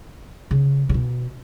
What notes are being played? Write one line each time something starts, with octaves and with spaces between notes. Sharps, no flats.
C#3
C#3
B2